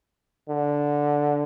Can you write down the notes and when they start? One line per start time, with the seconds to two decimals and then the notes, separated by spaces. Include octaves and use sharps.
0.49 D3